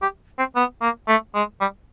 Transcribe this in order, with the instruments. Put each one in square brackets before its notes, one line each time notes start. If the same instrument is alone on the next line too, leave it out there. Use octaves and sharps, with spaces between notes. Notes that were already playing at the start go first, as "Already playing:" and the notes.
[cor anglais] G4
C4
B3
A#3
A3
G#3
G3